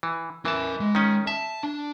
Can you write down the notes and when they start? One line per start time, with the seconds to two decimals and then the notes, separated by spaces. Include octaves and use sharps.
0.03 E3
0.45 E3 A#4 E5 A5
0.80 G#3
0.95 D#3 C#4
1.27 E5 A5
1.63 D4